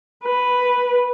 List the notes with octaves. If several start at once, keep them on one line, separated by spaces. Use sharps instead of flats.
B4